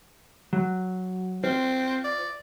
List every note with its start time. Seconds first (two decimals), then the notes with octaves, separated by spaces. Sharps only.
0.53 F#3
1.44 C4 F4 C5
2.04 D5